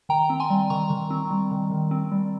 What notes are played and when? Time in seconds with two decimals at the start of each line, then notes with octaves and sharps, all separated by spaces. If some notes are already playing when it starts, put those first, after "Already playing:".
0.09 D#3 G5 A#5
0.30 C4
0.40 G#5 C6
0.50 G3
0.70 D#3 A#5 C#6
0.90 D#3
1.10 C4
1.31 G3
1.51 D#3
1.71 D#3
1.91 C4
2.12 G3